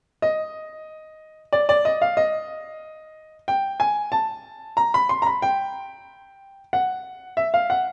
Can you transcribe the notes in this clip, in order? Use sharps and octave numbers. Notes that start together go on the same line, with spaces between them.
D#5
D5
D5
D#5
F5
D#5
G5
G#5
A5
A#5
B5
C6
A#5
B5
G5
F#5
E5
F5
F#5